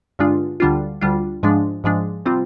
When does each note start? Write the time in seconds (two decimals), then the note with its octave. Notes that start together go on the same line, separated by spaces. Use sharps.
0.19 G2 D3 G#3 D4 F4
0.60 D2 D3 G3 D4 F4
1.01 D2 D3 G3 D4 F4
1.43 G#2 F3 G#3 D4
1.84 G#2 F3 G#3 D4
2.26 C3 G3 C4 F4